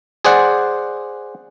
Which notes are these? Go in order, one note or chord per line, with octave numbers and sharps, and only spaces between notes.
G#4 C5 D5 F#5